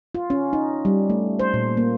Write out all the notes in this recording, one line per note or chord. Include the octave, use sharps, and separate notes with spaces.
F4
C#4
D#4
G3
A3
C5
A#2
A#3